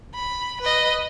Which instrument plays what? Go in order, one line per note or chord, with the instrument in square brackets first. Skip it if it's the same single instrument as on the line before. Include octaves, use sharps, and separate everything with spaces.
[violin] B5
B4 D#5